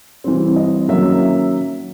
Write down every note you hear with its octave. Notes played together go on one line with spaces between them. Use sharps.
E3 G3 C4
D#5
D#3 F#3 A#3 C#4 E5